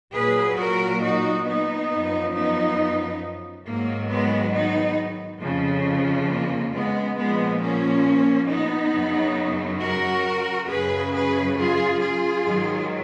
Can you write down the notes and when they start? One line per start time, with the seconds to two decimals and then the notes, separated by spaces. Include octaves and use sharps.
0.13 A#2 F#3 G#4 B4
0.57 F#4 A#4
1.01 D#4 F#4
1.46 B3 D#4
1.89 F#2 F3
2.33 B3 D#4
3.64 G#2 D#3 F#3 A#3
4.09 G#3 B3
4.53 B3 D#4
5.40 F2 C#3 F3
6.28 A#3
6.72 G#3 B3
7.16 A#2 F3 G#3 B3
7.60 A#3 C#4
8.49 B3 D#4
8.93 F#2 C#3 F#3
9.80 F#4 A#4
10.68 F#2 C#3 F#3 G#4 B4
11.12 G#4 B4
11.56 F4 G#4
12.00 F4 G#4
12.44 G#2 D#3 F#3